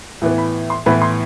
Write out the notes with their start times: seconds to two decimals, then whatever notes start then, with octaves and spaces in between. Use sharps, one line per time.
0.22 A2 E3 B3
0.38 B5
0.70 C6
0.86 A2 E3 B3 B5
1.02 C6